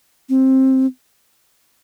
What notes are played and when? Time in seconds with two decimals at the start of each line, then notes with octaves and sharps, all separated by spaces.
0.29 C4